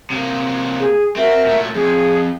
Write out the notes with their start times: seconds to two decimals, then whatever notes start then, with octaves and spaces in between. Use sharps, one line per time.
0.10 C3 A#3
0.78 G#4
1.16 C4 F#4 A#4 E5
1.45 A#2 A3
1.75 F2 G#4